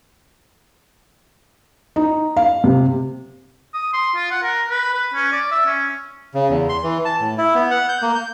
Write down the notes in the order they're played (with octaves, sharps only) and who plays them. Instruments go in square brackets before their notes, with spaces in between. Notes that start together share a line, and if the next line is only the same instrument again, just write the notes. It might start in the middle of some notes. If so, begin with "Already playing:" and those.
[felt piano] D#4
F5
C3
[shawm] D#6
C6
F4
F#5
A#4
B4
B4
C#4
D5
E5
C#4
[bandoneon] C#3
E2
C6
E3
A5
A2
E4
B3
F#5
G6
A#3
G6